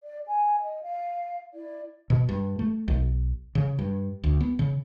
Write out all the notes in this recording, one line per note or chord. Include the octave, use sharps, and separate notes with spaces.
D5
G#5
D#5
F5
E4 D5
B2
G2
A3
B1
C#3
G2
D2
B3
C#3